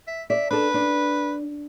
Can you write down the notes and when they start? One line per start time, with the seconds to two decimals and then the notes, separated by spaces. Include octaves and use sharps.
0.08 E5
0.30 D5 E5
0.51 D4 A4 B4
0.74 D4